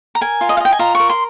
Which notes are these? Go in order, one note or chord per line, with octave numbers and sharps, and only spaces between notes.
A#5
A#4 G#5
F4
D#5
F5
D#5 G5
G#5
F4 A#5
A#4 C#6
C6